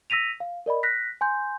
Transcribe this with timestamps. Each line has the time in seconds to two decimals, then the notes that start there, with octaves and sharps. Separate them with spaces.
0.10 E6 A#6 B6 D#7 F7
0.40 F5
0.66 A#4 D5 D#5 B5
0.83 F#6 A#6 B6
1.21 G#5 C6 G6